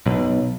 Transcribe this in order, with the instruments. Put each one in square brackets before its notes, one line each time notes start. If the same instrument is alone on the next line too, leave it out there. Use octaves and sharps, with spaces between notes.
[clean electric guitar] B1